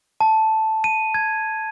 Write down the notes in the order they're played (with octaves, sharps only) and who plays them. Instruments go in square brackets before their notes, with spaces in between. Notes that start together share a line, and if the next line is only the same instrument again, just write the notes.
[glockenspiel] A5
D#7
G#6